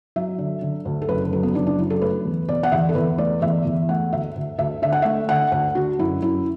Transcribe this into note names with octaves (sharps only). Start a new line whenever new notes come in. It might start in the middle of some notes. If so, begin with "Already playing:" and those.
F#3 E5
D3
D3
D2
A4
F#1 B4
F#3 A4
B3
F#1 D4
D4
F#3 E4
A4
A3 B4
E2
B2 D5
F#5
E2 E5
A4
E2 B4
A3 D5
E2 E5
E2
A3 F#5
D2 E5
D2
D2 E5
D3 E5
F#5
A3 E5
D3 F#5
D2 F#5
D3 F#4
F#2 E4
F#2 E4